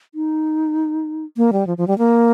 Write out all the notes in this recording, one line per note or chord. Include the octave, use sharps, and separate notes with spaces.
D#4
A#3
G3
F3
F3
G3
A#3